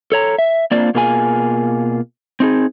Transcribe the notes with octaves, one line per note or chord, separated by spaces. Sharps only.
A4 C#5 A#5
E5
A#3 C4 D4 F4 D5
B2 A#3 F4 G#4 B4 G#5
C4 D#4 G#4